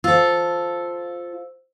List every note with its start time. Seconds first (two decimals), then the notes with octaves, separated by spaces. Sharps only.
0.04 F4 A4 C5 E6